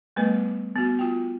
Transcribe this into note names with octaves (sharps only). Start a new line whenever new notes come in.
G3 A3 B3 B4 D#5
B3 F#4
F4 G5